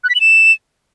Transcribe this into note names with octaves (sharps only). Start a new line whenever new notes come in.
F#6
B6
F#7
E7